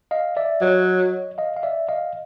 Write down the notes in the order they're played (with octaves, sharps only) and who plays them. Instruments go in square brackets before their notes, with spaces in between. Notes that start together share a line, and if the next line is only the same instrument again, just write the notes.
[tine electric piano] D#5 F5
D5 E5
[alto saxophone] F#3 [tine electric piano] C#5 D#5
[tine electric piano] D#5 F5
F5
D5 E5
D#5 F5